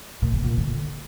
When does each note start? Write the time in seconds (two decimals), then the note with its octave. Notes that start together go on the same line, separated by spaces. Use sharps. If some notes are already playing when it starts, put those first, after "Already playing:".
0.22 A#2
0.33 C3
0.43 A#2
0.57 D3